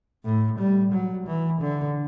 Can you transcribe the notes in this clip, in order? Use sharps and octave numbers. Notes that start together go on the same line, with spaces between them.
A2
G3
F#3
E3
D3